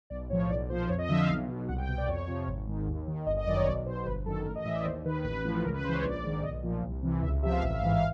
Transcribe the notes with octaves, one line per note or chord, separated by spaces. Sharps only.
B1 D5
A2 F3 C#5
B1 D5
A#2 F3 C5
F2 C#5
D#5
D3 F3 E5
F5
B1
B2
C2 F#5
G5
B2 G5
D5
F2 C#5
C3 F3
G#1
G#2 D#3
D#2
D#3
G1 D#5
D#5
F#2 D#3 D5
C#5
B1 D5
B2 C5
G1 B4
F#2 D#3 A4
A1 A#4
D#5
A2 E3 E5
D5
D#2 C5
D#3 B4
A1 B4
A2 F3
C#2 A#4
B4
C#3 E3 C5
C#5
A#1 D5
G#2 D#3
B1 D#5
A#2 F3
C2
C3 E3
C#2 E5
C3 F3 E5
F5
A1 E5
F5
G#2 E3 E5
F5